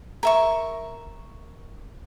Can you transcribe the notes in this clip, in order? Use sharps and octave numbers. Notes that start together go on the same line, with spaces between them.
A#4 E5 C#6